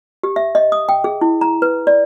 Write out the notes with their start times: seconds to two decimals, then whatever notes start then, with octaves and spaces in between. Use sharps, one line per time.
0.23 G4
0.36 E5
0.55 D#5
0.72 D#6
0.89 G5
1.04 G#4
1.21 E4
1.41 A#5
1.62 B4
1.87 D5